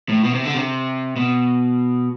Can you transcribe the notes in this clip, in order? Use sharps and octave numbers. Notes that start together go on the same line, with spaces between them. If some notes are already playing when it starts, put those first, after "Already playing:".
A2
B2
C3
D3
C3
B2